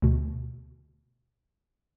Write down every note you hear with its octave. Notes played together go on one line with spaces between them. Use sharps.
D2 B2